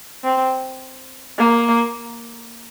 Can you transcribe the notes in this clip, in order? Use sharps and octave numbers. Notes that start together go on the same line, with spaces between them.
C4
A#3